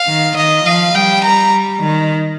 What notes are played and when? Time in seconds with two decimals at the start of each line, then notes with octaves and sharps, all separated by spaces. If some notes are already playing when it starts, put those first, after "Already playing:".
Already playing: F5
0.08 D#3
0.37 D#3 D#5
0.65 F3 F5
0.95 G3 G5
1.24 A#5
1.83 D#3